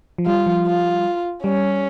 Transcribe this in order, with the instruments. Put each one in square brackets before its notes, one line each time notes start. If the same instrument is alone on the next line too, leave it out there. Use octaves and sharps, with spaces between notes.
[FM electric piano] F3
[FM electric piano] G3 [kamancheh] F4
[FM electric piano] F3
[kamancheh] F4
[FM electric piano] G3 [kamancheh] C#4